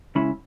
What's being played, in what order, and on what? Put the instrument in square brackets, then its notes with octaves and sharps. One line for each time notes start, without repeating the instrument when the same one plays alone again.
[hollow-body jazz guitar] C#3 G#3 C#4 E4 B5